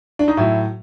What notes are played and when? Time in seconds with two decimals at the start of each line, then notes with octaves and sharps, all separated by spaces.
0.19 D4
0.28 D#4
0.37 A2 F#3 E4